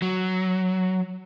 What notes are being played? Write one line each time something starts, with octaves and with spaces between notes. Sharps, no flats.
F#3